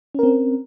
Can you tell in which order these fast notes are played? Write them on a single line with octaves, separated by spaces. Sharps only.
C#4 A#4 C4